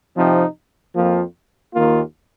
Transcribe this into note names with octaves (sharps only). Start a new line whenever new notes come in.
C3 F3 C4 D#4
F2 F3 A#3 F4
D#2 D#3 A#3 F4